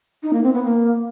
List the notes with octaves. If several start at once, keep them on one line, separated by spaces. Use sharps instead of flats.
D#4
A#3
C4
B3
A#3